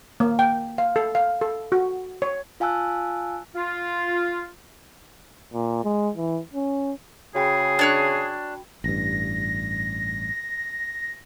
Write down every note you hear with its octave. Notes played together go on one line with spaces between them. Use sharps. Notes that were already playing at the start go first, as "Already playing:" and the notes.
A#3
G5
F5
A4
F5
A4
F#4
C#5
F4 F5 G#5 A5 E6 F#6
F4
A#2
G#3
E3
C#4
C#3 F#4 G#4 G5 B5
D4 C#5 F#6
A1 G2 A#6